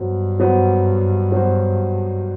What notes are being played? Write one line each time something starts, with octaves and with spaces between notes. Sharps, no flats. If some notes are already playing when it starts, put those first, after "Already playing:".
Already playing: G2 F#3 B3 F#4 C5
F#3 B3 F#4 C5
F#3 B3 F#4 C5